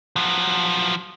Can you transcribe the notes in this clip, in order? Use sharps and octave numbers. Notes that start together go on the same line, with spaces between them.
F3 F#3